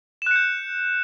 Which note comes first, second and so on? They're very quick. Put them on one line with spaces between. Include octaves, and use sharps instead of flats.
E7 F#6 C#7 G6